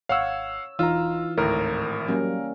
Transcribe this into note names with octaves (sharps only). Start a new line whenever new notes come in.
G#1 C#5 F5 F#5 E6
E1 E3 D#4 F4 A#5 E6
G#1 D2 A2 A#4
F#3 G3 A#3 C#4